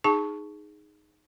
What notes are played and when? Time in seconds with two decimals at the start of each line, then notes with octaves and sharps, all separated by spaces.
0.04 D#4 G#4 A5 C#6